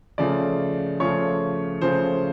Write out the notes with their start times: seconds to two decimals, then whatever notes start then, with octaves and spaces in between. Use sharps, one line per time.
0.18 C#3 F3 A3 D5
1.00 C#3 F3 A3 C#5
1.81 C#3 F3 A3 C5